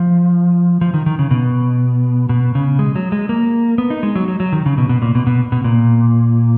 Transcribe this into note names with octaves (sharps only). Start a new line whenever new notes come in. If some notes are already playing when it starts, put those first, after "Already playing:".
Already playing: F3
F3
D#3
D#3
C#3
B2
B2
C#3
G#3
F#3
G#3
A#3
B3
D#4
G#3
F#3
F#3
F#3
D#3
C#3
B2
B2
A#2
B2
B2
B2
A#2